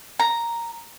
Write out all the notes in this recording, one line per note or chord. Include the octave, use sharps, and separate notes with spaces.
A#5